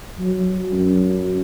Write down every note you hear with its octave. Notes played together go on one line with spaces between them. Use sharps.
F#3
F#2